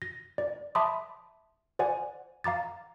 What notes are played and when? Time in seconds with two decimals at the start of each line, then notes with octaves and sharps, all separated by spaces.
0.02 A#6
0.38 D5
0.75 E5 A5 B5 C6 D6 D#6
1.79 C5 D5 F#5 G#5
2.44 F5 A#5 D6 A6